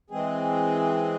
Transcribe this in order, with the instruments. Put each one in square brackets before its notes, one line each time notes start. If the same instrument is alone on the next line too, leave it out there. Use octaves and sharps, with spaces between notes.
[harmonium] E3 G#3 C4 G#4